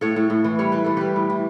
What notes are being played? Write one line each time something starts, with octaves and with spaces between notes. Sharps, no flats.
A2 A4 C#5
A2
A2
E3
G3 C#5
E3 B4
E3 A4
G3 G4 B4
A2
E3